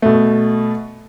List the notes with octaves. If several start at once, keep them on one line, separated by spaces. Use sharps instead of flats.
B2 A3